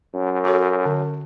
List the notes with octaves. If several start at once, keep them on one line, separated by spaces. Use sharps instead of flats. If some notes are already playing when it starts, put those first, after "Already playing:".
F#2
F#4 A4 C#5
D3